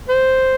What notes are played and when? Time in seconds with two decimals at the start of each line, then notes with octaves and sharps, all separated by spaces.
0.09 C5